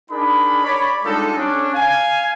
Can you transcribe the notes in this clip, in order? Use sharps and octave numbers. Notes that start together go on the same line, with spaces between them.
D4 D#4 G#4 A#4 B5
C#5 D5 B5
G3 G#3 D4 D#4 F4 A4
C#4 D4
F5 G#5